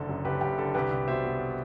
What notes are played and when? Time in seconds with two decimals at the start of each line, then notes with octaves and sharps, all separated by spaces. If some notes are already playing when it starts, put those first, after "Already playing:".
Already playing: F#1 D3 A4
0.09 F#2
0.24 F#1 G4 B4
0.41 F#1 G4
0.58 D3 A4
0.74 C2 G4 B4
0.91 C2
1.08 B2 C5 E5
1.24 B2